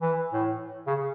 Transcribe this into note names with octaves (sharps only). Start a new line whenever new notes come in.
E3
A2
C#3